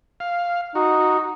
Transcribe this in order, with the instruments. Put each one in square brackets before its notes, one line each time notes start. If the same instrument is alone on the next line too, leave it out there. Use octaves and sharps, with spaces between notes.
[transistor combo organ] F5
[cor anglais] D#4 [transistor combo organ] F#4